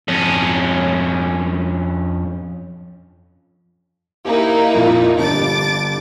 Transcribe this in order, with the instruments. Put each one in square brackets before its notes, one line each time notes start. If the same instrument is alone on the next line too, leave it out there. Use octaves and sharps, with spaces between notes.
[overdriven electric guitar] F2 C#4
[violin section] A#3 D#4 E4 [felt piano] G4
[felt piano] F2 A#2
[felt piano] G1 D4 G4 [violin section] D6 A6